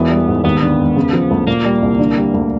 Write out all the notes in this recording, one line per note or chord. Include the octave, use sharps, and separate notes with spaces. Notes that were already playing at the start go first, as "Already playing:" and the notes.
Already playing: E1 E3 B3
G3
G#2
D#2 B3
D3
E1
C#3
F3
D2
A#2 A#3
G3
C2
D3
G3
D2